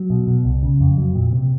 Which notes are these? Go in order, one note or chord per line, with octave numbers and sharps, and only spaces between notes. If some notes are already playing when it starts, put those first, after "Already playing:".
Already playing: F#3
B2
B2
C2
C#3
F2
F#3
A#2
C3